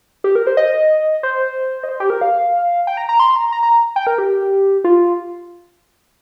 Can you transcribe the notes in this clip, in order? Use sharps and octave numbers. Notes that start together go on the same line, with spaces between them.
G4
A#4
C5
D#5
C5
D#5
C5
G4
A#4
F5
G5
A#5
A#5
C6
A#5
A#5
A#5
G5
A#4
G4
F4